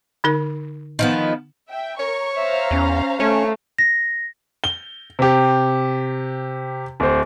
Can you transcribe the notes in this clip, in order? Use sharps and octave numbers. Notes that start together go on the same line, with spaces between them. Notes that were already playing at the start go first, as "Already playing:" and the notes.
D3 D#4 A#4
D#3 F3 B3
E5 G5
A#4 C#5 C#6
C5 E5 F5 A#5
E2 C#4
A3 C#4 C#5
A#6
G7
C3 G4
D1 C5